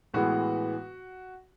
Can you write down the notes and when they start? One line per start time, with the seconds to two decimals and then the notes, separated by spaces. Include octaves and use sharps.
0.14 A2 E3 G#3 B3 F#4